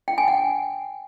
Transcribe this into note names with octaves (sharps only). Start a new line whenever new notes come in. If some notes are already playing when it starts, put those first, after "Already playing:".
G5
G#5
F#5